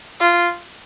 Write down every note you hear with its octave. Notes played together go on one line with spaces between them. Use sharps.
F4